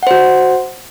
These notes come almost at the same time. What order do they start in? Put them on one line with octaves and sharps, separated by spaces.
F#5 C5 F#4